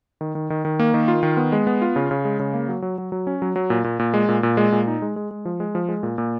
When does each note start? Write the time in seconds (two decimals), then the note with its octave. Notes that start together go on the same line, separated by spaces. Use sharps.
0.21 D#3
0.35 D#3
0.50 D#3
0.65 D#3
0.79 A#3
0.94 D#3
1.08 F4
1.23 D#3
1.37 B3
1.52 G#3
1.67 B3
1.82 F4
1.96 C#3
2.11 C#3
2.25 G#3
2.40 C#3
2.53 A#3
2.68 F#3
2.82 F#3
2.98 F#3
3.12 F#3
3.27 C#4
3.42 F#3
3.56 F#3
3.70 A#2
3.84 A#2
3.99 A#2
4.14 G#3
4.29 A#2
4.43 A#2
4.57 G#3
4.72 A#2
4.87 D#4
5.02 G#3
5.16 G#3
5.31 G#3
5.45 F3
5.60 G#3
5.75 F3
5.89 G#3
6.03 A#2
6.18 A#2